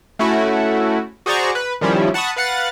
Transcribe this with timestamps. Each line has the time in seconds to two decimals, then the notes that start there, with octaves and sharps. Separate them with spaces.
0.19 A3 C#4 E4 F#4
1.26 F#4 G#4 C5 D5 A#5 C#6
1.55 B4
1.81 D#3 F3 G3 C#4 E4
2.14 F#5 A5 B5 C#6 D#6
2.36 B4 F5 F#5 F#6 A6